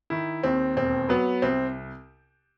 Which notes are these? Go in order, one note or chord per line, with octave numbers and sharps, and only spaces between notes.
D#3 E4
D#2 C4
E1 C4
F#3 B3
C2 C4